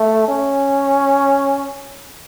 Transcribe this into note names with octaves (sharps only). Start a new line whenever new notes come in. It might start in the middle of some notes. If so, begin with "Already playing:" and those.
Already playing: A3
C#4